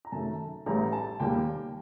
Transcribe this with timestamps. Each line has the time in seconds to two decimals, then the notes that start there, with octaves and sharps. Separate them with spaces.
0.05 A#5
0.12 F#2 D#3 A3 A5
0.66 A1 A2 G3 A#5
0.93 A5
1.20 D#2 D#3 G3 A#3 G5